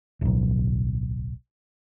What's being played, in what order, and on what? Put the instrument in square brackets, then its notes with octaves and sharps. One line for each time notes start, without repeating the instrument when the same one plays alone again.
[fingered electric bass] D1 B1